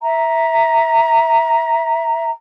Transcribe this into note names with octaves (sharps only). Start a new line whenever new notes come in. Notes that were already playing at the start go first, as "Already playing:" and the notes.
E5 A#5